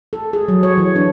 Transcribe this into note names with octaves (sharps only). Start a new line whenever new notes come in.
A4
G#4
F#3
C#5
E3
D4